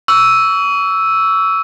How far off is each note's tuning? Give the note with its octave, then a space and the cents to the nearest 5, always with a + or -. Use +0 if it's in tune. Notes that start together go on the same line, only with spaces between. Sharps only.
C#6 +35 E6 +0